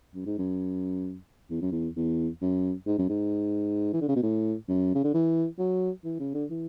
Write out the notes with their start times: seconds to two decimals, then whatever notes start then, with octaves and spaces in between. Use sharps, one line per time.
0.15 F#2
0.26 G#2
0.38 F#2
1.51 E2
1.62 F#2
1.72 E2
1.96 E2
2.42 F#2
2.87 G#2
2.98 F#2
3.09 G#2
3.93 E3
4.01 D3
4.09 C#3
4.16 B2
4.23 A2
4.69 F#2
4.95 C#3
5.04 D3
5.14 E3
5.59 F#3
6.05 E3
6.20 C#3
6.35 D3
6.50 E3